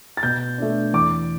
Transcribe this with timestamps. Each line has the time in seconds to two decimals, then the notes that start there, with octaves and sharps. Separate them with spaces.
0.17 A6
0.23 B2 G6
0.58 A3 D4
0.93 E2 D6